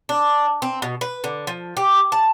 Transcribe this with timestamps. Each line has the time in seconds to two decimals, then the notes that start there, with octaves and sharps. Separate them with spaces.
0.09 D4
0.62 C4
0.82 B2
1.01 B4
1.24 D3
1.47 F3
1.77 G4
2.12 A5